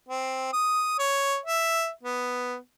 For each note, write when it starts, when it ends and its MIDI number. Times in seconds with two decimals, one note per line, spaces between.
0.09 0.49 60
0.53 0.96 87
0.99 1.38 73
1.46 1.90 76
2.03 2.56 59